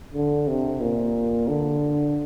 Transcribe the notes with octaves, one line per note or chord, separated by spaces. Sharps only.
D3
C3
A#2
D3